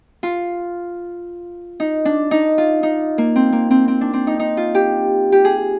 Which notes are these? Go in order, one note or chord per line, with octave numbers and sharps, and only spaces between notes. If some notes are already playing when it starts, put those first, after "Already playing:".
F4
D#4
D4
D#4
F4
D#4
A#3
C4
A#3
C4
C4
D4
C4
D#4
D#4
F4
G4
G4
G#4